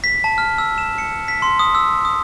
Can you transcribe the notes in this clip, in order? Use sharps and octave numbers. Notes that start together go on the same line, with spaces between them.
B6
A5
F6
E6
E7
C#7
B6
C6
D#6
E6
D#6